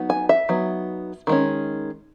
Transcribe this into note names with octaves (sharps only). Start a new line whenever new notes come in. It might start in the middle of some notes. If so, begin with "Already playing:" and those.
Already playing: F#3 B3 D#4
G#5
E5
F#3 B3 D#4
D#3 G#3 C#4